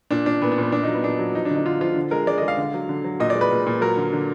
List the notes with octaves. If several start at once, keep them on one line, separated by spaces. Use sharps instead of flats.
A#2 D4
A#2 D4
A#2 B3
D4
A#2 B3
A#2 D4
F#3 D#4
B3
A#2 D4
F#3
F3 D#4
D4
D3 D#4
D3 F4
F3 F4
D3
G#3 A#4
G#3 D5
G#3 D#5
F5
D3
F#3
D3
F#3
A#2 D#5
D5
G#3
B4
A#2
A#2
F#3 A#4
D3
D3